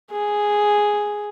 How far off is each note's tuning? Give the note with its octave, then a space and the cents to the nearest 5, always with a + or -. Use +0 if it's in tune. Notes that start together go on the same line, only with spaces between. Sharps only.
G#4 +0